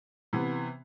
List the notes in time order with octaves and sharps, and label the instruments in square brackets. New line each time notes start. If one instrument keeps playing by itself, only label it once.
[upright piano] C3 E3 B3